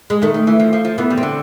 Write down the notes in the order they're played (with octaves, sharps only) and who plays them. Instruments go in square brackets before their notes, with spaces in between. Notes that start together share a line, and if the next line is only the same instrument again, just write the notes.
[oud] G#3
[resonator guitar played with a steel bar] D#3 [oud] A3
[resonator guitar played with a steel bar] D#3
E3
F3
F3
F3
[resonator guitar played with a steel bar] E3 [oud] B3
[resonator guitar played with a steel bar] G3
[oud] C4
[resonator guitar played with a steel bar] D3